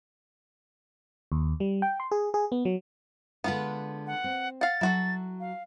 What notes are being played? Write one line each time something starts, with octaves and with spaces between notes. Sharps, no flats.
D#2
G3
G5
C6
G#4
G#4
B3
F#3
D3 G#3 B3 D4 F4 B4
F#5
C4
F5 F#5 A6
F#3 E4 F#4 A4
F5